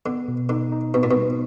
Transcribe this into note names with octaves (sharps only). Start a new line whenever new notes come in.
D3 B3
B2
D3 D#4
D#4
B2 B3
A#2
B2
G3